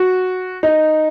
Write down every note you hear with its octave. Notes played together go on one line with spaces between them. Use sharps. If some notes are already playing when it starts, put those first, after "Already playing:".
Already playing: F#4
D#4